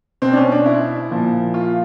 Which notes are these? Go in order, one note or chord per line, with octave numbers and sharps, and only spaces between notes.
B2 C4
D4
C#4
D4
E4
A#2 F3
F4